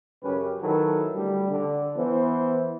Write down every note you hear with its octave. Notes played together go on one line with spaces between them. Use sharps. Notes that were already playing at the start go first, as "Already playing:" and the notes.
F#2 C#3 C#4 G4 B4
D#3 F#3 E4 A4 B4
D2 D3 G3
D3
E3 B3 C5